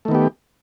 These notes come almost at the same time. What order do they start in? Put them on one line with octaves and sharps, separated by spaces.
A3 D#3 B3 G4